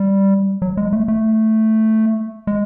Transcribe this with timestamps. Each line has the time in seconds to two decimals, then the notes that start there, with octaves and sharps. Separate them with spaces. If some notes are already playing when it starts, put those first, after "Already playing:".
Already playing: G3
0.62 F#3
0.77 G#3
0.93 A3
1.08 A3
2.47 G#3